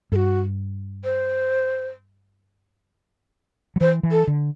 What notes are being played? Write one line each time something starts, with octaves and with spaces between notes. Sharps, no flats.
G2 F#4 A4
C5
F#3
E3 C5
E3
A4
D3